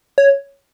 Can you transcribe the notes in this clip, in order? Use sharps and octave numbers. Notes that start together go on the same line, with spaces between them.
C#5